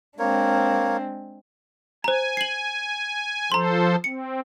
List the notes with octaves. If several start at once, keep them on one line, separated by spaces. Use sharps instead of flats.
G#3 A#3 C4 D4 A#4 C#5
C5 G#5 A#5
C7 F#7
F3 A4 C5 A#5 C6
C4 C#7